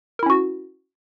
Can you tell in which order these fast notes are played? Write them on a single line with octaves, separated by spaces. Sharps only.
A#4 E4 C#4 F#4